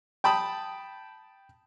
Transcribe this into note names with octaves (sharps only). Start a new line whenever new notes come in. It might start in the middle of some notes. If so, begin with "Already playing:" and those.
G5 A5 B5 D#6